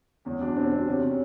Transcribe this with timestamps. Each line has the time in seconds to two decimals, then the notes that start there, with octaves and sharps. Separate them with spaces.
0.25 E2 C#4
0.41 F#3 D4
0.57 B2 C4
0.72 F#3 C4
0.87 C3 C#4
1.02 C#4